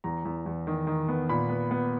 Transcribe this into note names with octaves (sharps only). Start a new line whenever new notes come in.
E2 A#5
E2
E2
D#3
D#3
B3
A#2 B5
B3
B3